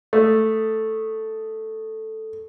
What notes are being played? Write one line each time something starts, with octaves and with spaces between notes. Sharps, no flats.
A3 A4